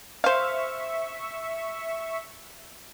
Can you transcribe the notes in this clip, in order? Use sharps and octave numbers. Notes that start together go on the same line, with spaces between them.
C5 E5 F5 C#6